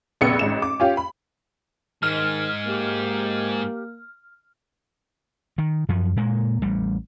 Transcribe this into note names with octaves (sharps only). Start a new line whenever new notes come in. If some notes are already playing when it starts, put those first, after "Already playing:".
F1 A#1 C#3 B3 C#7
A1 G#2 E7
D6
C#4 F4 G4
B5
G#2 D#3 G#3 F6
A#3 G4
D#3
F#2 F3
A#2 G#3 A#3
A1 G3